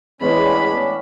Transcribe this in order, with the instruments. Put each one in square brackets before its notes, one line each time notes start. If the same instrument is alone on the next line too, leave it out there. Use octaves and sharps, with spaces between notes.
[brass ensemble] E2 [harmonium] A2 C#4 D4 [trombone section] G#3 B3 [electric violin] B5